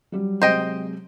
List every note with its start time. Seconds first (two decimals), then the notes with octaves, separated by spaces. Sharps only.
0.12 F#3 G3
0.42 C3 F#3 G#3 C5 D#5 G5